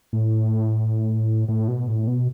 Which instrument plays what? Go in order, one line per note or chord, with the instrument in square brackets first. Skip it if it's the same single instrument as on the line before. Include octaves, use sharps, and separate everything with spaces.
[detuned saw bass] A2
A2
B2
A2
B2